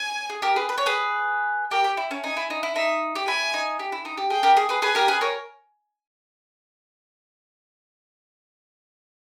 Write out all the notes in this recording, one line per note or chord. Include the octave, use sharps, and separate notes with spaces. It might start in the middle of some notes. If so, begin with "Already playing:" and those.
Already playing: G#5
G#4
G4 A#4
G#4 B4
B4
C#5
G#4 B4
G4 A#4 G5
G4
E4
C#4
D#4 G#5
E4
D#4
E4
D#4 E5
G4
E4 G#5
D#4
G4
E4
D#4
G4
G#4 G5
G4 A#4
G#4
G#4 B4
G#4 B4 G#5
G4 A#4
G#4 B4
A#4 C#5